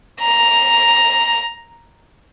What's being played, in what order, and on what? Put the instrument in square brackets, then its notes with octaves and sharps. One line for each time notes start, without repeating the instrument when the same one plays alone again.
[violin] A#5